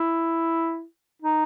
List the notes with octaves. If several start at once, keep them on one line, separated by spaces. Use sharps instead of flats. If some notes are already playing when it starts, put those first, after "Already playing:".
Already playing: E4
D#4